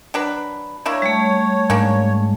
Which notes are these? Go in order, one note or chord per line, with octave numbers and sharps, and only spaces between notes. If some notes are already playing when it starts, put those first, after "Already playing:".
F#3 D4 B4
A#3 D4 E4 C#5
G3 A3
G#2 A#3 C#4 D4